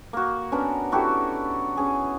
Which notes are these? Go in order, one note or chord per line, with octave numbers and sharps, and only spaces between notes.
A#3 F#4
B3 C#4 D4 A#4
E4 F#4 G4 A4
C#4 G#4